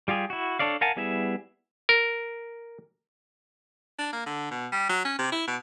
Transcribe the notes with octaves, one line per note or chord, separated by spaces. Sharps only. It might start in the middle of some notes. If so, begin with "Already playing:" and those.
G3 F4 G4 G#4
E4 F#4
D4 A4 C#5 D5 F5
A#4 F5 F#5 G#5 A5
G3 B3 E4 G#4 E5
A#4
D4
A#3
D3
B2
G3
F#3
C#4
C3
E4
B2